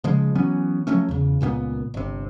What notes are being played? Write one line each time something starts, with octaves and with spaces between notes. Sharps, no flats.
C#3 F3 G#3
E3 F#3 B3 C#4
F3 F#3 A3 C#4
E2 C#3
C#2 A#2 A3 B3
G1 C3